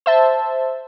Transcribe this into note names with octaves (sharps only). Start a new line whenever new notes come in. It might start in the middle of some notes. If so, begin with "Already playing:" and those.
C5 E5 A5